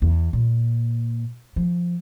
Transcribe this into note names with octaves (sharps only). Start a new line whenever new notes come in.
E2
A#2
F3